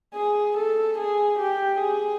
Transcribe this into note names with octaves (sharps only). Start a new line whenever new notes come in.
G#4
A4
G#4
G4
G#4